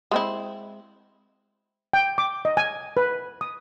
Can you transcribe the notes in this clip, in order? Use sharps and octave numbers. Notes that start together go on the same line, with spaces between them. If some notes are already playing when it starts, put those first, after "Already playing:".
G#3 C4 E4
G5
D6
D#5
G#5
B4
D#6